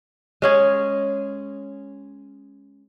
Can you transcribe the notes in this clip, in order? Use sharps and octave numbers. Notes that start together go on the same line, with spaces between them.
G#3 C#4 G#4